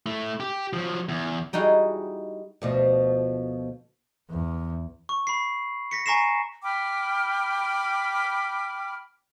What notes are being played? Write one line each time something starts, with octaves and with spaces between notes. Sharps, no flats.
A3 E4
G4
F3 F#3
E2
G3 D#4 E4 F#4 G#4
D2 B2 F3
E2
C#6
B5 C7
A#6 B6 C#7
G#5 A#5 C#6 A#6 C7 E7
G5 B5 D6 F6